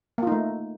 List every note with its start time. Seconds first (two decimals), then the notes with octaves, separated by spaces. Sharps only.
0.18 A#3
0.23 F4
0.27 D#4
0.32 A3